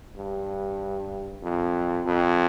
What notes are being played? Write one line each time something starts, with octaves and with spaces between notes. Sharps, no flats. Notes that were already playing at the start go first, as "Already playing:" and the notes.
G2
F2
F2